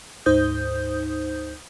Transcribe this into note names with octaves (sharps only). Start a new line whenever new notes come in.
D2 G#2 D#4 C5 D#6 G6